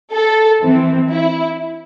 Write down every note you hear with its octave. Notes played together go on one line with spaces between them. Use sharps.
A4
E3 C4
E4